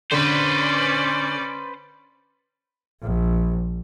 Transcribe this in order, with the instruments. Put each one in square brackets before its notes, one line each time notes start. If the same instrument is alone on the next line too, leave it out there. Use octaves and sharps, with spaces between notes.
[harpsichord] D3 [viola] C#4 D5 [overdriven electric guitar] B4 C5
[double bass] A#1